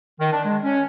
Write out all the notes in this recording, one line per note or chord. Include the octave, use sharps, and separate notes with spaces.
D#3
D4
G#3
C#4